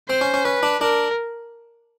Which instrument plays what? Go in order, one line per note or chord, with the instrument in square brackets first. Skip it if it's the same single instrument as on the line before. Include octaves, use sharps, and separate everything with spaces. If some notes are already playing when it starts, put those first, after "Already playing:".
[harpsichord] C4 [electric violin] C5
[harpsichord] C#4
C#4
[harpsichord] C#4 [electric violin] B4
[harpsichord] D4
[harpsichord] D4 [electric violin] A#4